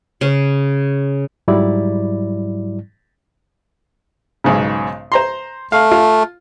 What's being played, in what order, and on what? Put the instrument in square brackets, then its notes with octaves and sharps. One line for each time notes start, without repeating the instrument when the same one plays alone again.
[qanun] C#3
[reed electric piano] G#2 F#3 G3 E4 D5
[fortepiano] B1 G#2 C#3
C5 A#5 C6
[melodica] A3 [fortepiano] F5
[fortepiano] F4